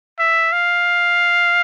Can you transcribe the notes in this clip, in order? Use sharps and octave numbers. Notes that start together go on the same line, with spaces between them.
E5
F5